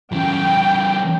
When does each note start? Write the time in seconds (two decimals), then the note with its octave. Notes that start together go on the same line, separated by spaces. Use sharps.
0.13 C#3 E3 G5